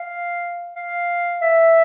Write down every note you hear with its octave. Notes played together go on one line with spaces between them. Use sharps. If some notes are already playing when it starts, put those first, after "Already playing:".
Already playing: F5
F5
E5